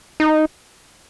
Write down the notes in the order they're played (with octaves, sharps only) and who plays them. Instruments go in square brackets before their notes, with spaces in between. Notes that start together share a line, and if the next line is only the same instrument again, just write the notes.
[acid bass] D#4